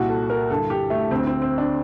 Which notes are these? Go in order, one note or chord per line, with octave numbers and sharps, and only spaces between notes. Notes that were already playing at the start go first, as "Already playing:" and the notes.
Already playing: C2 A#2 F#4
A4
A#4
G2 D3 A4
G4
A3
D2 D3 C4
C4
C4
D4